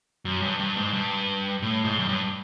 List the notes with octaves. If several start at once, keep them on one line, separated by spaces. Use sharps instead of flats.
F#2
G2
G2
G#2
G2
A2
G#2
F#2
G2